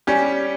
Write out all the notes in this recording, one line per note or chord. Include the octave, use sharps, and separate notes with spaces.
G3 C#4 G4